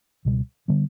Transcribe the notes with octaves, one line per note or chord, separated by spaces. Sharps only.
C#2 B2 G3
D3 G3 B3